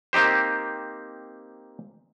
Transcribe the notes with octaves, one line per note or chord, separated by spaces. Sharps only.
A#3 C4 D#4 G4 C5